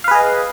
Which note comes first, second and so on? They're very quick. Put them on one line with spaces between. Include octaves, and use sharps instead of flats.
F5 B4 G#4 D#5